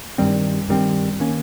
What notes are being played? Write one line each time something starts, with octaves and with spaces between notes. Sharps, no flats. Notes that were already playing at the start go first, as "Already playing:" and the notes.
G2 D#3 G3 C4
G2 D#3 G3 C4
D#3 A#3 C#4